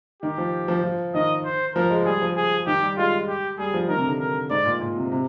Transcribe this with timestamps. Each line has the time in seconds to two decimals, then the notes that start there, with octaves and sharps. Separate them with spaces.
0.22 D#3 G4
0.38 F3
0.68 F3
0.84 F3
1.14 D#3 D#5
1.45 C5
1.75 F3 A#4
1.90 G#3
2.05 G3 G#4
2.21 F3
2.36 G#4
2.67 D#3 G4
2.81 G3
2.97 G#3 F4
3.28 G4
3.58 G3 G#4
3.74 F3
3.88 D#3 A#4
3.96 C3
4.04 D3
4.20 A#4
4.50 G#2 D5
4.65 A#2
4.81 A#2
4.96 C3
5.12 C3